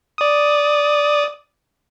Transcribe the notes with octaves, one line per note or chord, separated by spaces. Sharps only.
D5 D#6